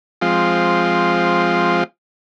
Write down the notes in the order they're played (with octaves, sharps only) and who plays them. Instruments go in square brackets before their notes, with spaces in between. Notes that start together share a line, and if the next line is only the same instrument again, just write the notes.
[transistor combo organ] F3 G#3 C4 F4